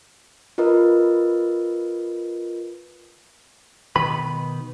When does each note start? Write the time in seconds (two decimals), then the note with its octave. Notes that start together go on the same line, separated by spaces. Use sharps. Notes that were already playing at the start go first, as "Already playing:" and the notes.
0.58 F4 A#4 B4 D#5
3.96 B2 D#3 B4 B5